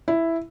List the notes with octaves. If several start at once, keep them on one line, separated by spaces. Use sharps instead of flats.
E4